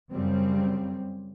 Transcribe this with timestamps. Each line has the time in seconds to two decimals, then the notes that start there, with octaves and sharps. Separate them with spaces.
0.12 F#2 C#3 G3 C4